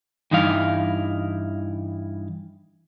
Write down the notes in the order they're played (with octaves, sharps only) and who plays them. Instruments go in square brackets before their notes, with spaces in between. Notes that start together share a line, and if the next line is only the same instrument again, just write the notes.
[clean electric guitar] G2 E3 D#4 E4 F5